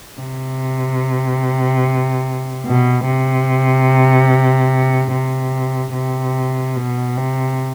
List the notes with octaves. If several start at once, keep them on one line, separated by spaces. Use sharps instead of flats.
C3
B2
C3
C3
C3
B2
C3